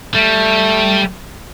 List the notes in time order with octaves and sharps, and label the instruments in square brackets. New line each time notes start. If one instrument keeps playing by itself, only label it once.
[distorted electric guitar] G3 [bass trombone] A3